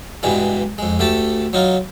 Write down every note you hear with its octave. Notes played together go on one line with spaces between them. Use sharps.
G2 B2 E3 G3 G#3
F2 G#3
D2 A3 G4 A5
F#3 D#4 F4